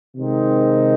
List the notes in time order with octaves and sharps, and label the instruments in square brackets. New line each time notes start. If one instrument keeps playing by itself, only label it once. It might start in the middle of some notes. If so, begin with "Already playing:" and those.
[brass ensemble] C3 D#3 G#3 C4 D#4